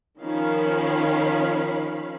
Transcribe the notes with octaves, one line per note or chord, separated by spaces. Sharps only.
D#3 F3 C#4 F5 B5